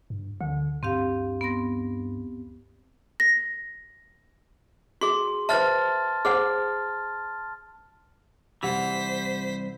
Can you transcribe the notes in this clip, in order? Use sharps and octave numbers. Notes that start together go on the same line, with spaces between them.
G2
D2 D3
G2 C4 G4 F5
B3 C6 A#6
A#6
F#4 G#4 C6
B4 C5 E5 A5 F6 A6
G#4 C5 F#5 F6
C2 E3 G4 C5 F#5 B6